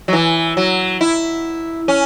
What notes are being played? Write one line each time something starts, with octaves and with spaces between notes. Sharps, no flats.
F#3
E3
F#3
E4
C#4